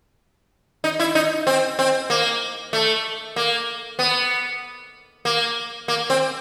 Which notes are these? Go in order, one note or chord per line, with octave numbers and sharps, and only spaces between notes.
D#4
E4
D#4
C4
C4
A#3
A3
A#3
B3
A#3
A#3
C4